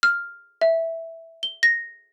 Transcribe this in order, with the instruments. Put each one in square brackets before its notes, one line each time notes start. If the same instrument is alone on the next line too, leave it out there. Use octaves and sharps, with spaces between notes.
[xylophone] F6
E5
G7
A#6